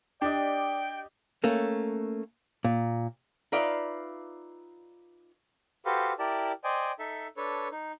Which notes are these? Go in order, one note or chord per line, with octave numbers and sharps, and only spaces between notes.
D4 G4 D5 D#5 G5
A3 A#3 C#4
A#2
D#4 F4 B4 D5 E5 F5
F#4 G4 A4 B4 C5 F5
E4 G4 A#4 D5 A5
C5 D5 D#5 G5 G#5
D#4 A4 E5
D4 A4 B4 C#5
D#4